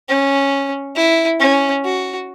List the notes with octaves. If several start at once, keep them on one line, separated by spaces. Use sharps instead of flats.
C#4
E4
C#4
F#4